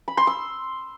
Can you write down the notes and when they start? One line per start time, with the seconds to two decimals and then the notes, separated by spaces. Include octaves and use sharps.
0.08 B5
0.17 C6
0.27 E6